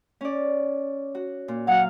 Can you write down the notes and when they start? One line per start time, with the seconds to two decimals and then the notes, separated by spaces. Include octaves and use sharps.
0.21 C#4 D5
1.15 F#4
1.48 A#2
1.67 F#3 F5 F#5